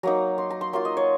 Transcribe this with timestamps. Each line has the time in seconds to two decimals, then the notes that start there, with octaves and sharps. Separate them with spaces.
0.03 F#3 A#3 D#4 A#5
0.38 C6
0.50 A#5
0.61 C6
0.73 F#3 A#3 F4 C6
0.85 D#5
0.97 C#5